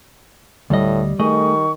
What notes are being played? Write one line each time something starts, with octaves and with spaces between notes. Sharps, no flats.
D2 A2 G3 D#5
D#3 A3 G#4 D#5 C#6